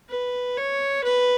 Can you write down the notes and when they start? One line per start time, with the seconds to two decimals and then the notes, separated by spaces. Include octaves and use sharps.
0.09 B4
0.57 C#5
1.04 B4